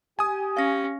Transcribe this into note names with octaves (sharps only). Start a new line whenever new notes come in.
G4 G#5 D#6
C#4 F5 A#6